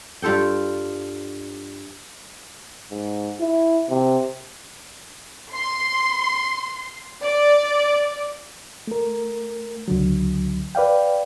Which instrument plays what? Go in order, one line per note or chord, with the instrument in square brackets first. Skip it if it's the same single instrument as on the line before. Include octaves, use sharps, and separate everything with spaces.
[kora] G2 F4 A4 G5
[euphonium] G#2
E4
C3
[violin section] C6
D5
[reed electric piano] A3 A#4
C#2 D3 F#3
B4 D5 F5 G5